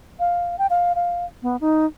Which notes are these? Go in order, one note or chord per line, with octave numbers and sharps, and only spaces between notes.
F5
G5
F5
F5
B3
D#4